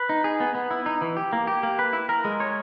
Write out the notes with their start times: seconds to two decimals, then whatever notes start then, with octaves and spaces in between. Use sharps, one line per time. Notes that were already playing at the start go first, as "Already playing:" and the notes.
Already playing: B4
0.09 D#4
0.24 G#4
0.40 B3
0.55 B3
0.71 E4
0.86 D#4
1.01 E3
1.17 G4
1.33 A#3
1.47 G4
1.63 A#3
1.79 B4
1.93 E4
2.09 A#4
2.25 G#3
2.40 C#5